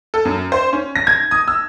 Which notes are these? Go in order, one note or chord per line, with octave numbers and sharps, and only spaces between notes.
A4
F#2
C5
C#4
A#6
G#6
D#6
E6